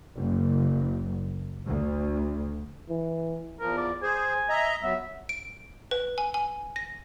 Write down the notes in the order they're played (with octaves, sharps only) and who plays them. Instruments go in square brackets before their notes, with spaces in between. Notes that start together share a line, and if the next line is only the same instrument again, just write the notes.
[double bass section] F#1
D2
[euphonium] E3
[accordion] E2 F3 [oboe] A#4
[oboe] D5
[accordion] G#4 C5 [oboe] G#5
[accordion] D#5 E5 A#5
[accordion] F#3 B3 [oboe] E5
[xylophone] D7
B4
G#5
G#5
A#6